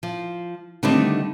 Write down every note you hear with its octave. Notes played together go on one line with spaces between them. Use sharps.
F3
D3 D#3 G3 A3 C4 D#4